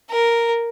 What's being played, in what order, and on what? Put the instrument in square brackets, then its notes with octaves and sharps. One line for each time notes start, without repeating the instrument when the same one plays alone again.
[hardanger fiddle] A#4